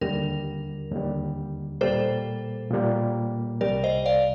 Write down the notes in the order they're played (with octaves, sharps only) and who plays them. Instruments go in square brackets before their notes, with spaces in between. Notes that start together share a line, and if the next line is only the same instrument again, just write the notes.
[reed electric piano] D#2 D3 G3 [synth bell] A#4
[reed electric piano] D#2 D3 G3
[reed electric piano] A#2 G3 A#3 [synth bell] A4 C5
[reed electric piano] A#2 G3 A#3
[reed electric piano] C2 C3 G3 [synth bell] A#4 D5
[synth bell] C5 D#5
D5 F5